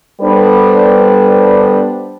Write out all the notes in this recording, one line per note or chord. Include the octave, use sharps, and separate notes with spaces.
G3 B3 D4 A4 B4 C5